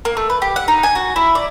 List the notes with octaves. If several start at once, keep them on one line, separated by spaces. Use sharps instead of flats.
A#3
A3
B4
G4
F#5
D#4
G#5
F#4
E4
D5